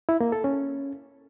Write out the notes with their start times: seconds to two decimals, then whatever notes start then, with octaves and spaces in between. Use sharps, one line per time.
0.09 E4
0.20 A#3
0.32 A4
0.44 C#4